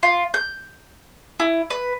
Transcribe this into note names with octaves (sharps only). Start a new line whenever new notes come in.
F4
G6
E4
B4